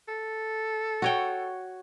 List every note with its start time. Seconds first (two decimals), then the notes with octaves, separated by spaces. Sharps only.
0.08 A4
1.02 F#4 C#5 G5